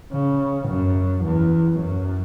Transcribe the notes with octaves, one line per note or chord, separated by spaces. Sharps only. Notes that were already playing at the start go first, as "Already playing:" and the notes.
C#3
F#2
E2
F#2